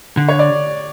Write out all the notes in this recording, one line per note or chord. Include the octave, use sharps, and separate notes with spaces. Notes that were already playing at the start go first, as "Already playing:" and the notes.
D3
C#5
D5